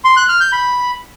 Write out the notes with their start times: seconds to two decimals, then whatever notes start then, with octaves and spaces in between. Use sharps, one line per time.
0.05 C6
0.17 F#6
0.28 F6
0.40 G6
0.52 B5